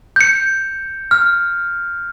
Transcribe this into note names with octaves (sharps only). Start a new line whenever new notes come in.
G6 C#7
F6